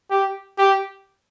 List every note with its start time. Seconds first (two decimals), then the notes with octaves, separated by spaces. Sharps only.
0.10 G4
0.58 G4